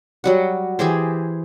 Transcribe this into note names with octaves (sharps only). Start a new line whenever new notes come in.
F#3 G3 F#5
E3 G4 G#4 C5